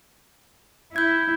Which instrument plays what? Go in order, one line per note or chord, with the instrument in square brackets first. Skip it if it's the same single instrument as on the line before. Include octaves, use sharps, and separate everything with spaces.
[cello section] E4 [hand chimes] G6 G#6